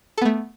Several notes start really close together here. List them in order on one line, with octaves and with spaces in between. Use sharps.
A4 B3 A3